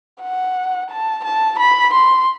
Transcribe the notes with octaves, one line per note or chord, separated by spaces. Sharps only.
F#5
A5
A5
B5
C6